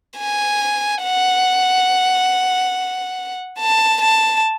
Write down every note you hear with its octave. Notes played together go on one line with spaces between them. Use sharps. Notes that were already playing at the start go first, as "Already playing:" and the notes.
G#5
F#5
A5
A5